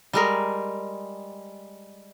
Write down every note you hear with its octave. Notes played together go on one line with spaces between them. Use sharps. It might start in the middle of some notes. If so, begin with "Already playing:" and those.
G3 G#3 A#4